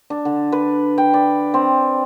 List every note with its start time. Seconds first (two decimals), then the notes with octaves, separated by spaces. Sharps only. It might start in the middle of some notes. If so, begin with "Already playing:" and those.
0.10 D4
0.25 D3
0.52 B4
0.98 G5
1.14 D5
1.54 C4